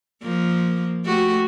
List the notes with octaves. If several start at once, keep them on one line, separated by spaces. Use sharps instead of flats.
F3 A#3
A3 F#4 G4